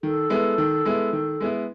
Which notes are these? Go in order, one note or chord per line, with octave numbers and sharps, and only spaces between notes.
D#3 A4
G#3 B3 E4
D#3
G#3 B3 E4
D#3
G#3 B3 E4